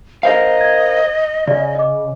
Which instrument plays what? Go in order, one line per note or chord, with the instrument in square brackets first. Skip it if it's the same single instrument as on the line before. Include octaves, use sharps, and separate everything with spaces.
[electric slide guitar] A#4 C5 F5 [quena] D#5
[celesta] G#6
[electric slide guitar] C#3 [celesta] D5
[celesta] D#5 D6